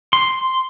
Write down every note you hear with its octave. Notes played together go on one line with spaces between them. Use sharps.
C6